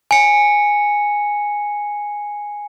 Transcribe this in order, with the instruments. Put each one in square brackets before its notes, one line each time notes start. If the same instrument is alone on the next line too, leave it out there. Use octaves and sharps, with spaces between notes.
[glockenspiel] G#5 C#7